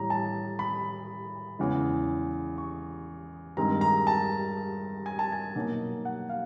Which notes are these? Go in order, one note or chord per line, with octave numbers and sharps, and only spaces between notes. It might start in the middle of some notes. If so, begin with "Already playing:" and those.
Already playing: A2 E3 G3 A#5
A5
B5
E2 C#3 E3 G#3
C#6
G2 D#3 G#3 C4 D#4 A#5
A#5
A5
G#5
A5
G#5
B2 F#3 A#3 D#4
F#5
F5